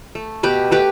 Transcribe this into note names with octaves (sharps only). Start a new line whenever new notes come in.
A3
B2 G4 B4
A3 G4 B4